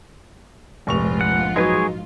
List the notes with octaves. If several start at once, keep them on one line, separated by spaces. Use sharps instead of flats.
F1 A#1 G#2 F4 C#6 F7
F#5
F#3 G#3 D#4 G#4 B4 C#5